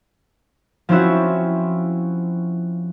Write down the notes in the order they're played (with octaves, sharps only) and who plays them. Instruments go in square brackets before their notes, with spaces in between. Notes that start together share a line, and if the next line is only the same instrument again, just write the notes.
[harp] F3 C4 C#4 E4 F#4